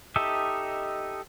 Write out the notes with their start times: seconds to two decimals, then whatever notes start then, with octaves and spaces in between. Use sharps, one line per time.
0.16 D#4 G4 A4 D#5 E5